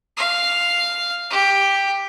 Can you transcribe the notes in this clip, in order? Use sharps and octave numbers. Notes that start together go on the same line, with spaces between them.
F5
G4